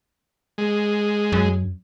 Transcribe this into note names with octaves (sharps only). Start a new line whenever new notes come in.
G#3
F#2